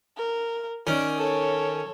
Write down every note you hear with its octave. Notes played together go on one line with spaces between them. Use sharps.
A#4
D#3 C#4 D5
A4 C#5